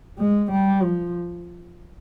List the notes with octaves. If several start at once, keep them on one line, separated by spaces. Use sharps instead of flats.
G#3
G3
F3